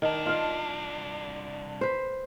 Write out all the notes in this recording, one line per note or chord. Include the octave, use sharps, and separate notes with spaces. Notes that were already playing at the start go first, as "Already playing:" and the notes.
C2 D#3 D4
F4 F5
B4 C5